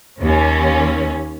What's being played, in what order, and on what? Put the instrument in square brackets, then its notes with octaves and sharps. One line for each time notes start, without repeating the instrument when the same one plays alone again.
[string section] D#2 C#4